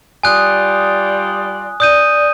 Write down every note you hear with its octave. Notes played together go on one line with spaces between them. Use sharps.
G3 F4 D5 G#5 D#6 F#6
D5 D#6 G6 D#7